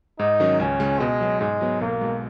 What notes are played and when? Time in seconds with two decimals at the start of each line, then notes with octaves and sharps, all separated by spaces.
0.19 G#2 D#4
0.40 D#3 F#3 C#4
0.60 C#2 C#4
0.80 C#3 G#3
1.00 B2 G#3
1.21 F#3 B3
1.40 G#2 G#3
1.61 F#3 B3
1.81 B1 A#3
2.01 B2 G#3